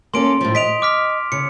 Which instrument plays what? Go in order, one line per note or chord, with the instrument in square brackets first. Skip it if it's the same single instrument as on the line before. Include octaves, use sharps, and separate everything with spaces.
[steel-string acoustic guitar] A#3 C#4 A4 [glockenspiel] C6 D7
[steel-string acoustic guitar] A2 F3
[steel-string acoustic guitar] D#5 [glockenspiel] B6 D7 F7
[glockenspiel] D6 F6 B6
[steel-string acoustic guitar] C#3 [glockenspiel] C#7